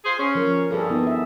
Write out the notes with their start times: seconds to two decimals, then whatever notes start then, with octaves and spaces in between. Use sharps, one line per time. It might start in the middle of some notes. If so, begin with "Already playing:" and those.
0.05 F4 G#4 C5
0.19 C#4
0.35 F3 A#4
0.71 G2 G#4 A4
0.90 B3 D#4 E4
1.07 E5